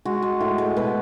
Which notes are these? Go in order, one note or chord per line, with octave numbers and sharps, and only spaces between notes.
G#3 F#4
G#3
A2
G#3
B2 B4